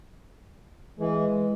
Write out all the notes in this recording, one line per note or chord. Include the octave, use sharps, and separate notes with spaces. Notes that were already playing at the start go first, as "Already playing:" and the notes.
E3 G#3